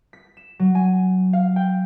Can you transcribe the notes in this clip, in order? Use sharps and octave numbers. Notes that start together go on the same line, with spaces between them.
B6
E7
F#3
G#5
F5
G5